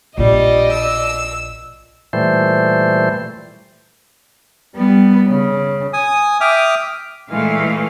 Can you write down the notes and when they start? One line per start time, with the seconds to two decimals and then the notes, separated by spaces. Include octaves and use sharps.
0.18 A#1 G3 F4 D5 D#5
0.72 E6
2.13 A#2 E3 G3 A3 C5
4.75 G3 B3
5.29 C#3
5.93 G#5 D#6
6.41 E5 G5 D6 D#6 F6
7.30 A#2 E3 G#3 A3 F5